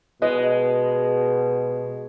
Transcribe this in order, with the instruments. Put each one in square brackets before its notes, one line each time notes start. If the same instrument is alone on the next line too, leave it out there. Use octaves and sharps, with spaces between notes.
[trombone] B2 [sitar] G#3 [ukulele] B4 D#5